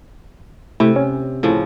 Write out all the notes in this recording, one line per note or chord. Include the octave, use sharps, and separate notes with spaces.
C3 A3 E4
C#4
A2 C#3 F3